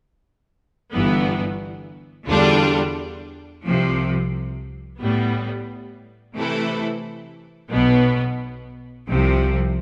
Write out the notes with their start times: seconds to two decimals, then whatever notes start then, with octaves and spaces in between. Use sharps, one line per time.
0.92 G1 G2 E3 B3
2.28 E2 D3 G3 D4 F4
3.63 C2 C3 F3
4.99 A2 G3 B3
6.35 C3 E3 A3 E4 A4
7.71 B1 B2 B3
9.08 C2 C3 F3